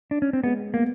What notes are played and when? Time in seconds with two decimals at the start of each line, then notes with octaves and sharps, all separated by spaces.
0.11 D4
0.22 C#4
0.33 C4
0.44 G#3 B3
0.74 A#3 B3